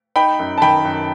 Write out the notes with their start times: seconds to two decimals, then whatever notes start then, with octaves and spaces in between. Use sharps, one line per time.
0.16 D#4 G5 B5
0.39 F#2
0.58 A5
0.61 D#3 G5 B5
0.85 F#2